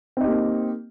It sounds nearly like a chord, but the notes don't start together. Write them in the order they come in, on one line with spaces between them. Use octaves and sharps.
C4 D#4 G4 A#3